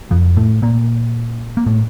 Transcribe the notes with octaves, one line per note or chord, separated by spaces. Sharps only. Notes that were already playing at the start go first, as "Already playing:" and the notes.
F2 F3
A2 A3
A#2 A#3
A#3
A2 A3